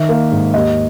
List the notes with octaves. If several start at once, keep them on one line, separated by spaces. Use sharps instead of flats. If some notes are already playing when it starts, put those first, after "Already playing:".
Already playing: D#3 E5
A#3
G#2
D#2 D#5